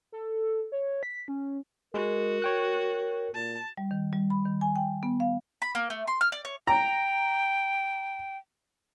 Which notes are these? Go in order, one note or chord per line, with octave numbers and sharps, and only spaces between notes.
A4
C#5
B6
C#4
G#3 F#4 A#4
C#5 G5 F#6
A#2 A5
G3
D#3
G3
B5
D#3
G#5
G5
B3
F5
B5
A#3
A3
C6
F6
D5
C#5
G5 A#5